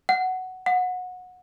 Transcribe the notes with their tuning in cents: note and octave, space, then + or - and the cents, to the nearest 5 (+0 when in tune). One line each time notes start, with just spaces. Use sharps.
F#5 +10
F#5 -20